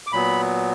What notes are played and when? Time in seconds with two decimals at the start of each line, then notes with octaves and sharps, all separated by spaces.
0.07 D6
0.13 A#2 F#3 B3 B5